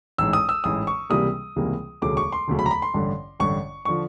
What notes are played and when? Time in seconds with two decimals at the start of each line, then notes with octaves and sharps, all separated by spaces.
0.18 A1 G#2 E3 E6
0.33 D#6
0.49 E6
0.64 A1 G#2 E3 D#6
0.87 C#6
1.10 C#2 C3 E3 G3 A#3 D#6
1.56 C#2 C3 E3 G3 A#3
2.02 E1 D2 C#3 F#3 A3 D6
2.17 C#6
2.32 C6
2.48 E1 D2 C#3 F#3 A3
2.59 B5
2.66 A#5
2.71 B5
2.82 C6
2.94 A1 G2 D3
3.40 A1 G2 D3 C#6
3.85 D3 F3 C#6